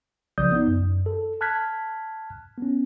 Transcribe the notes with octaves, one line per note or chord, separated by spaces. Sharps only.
B1 C#3 F3 D5 D#6 G6
B3 D#4
F#2
A4
A5 F6 F#6 G#6 B6
B3 C#4